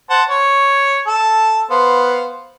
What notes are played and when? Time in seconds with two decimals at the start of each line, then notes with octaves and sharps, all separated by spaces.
0.10 C5 F#5 A5
0.29 C#5
1.07 A4 A5
1.70 B3 C5 F5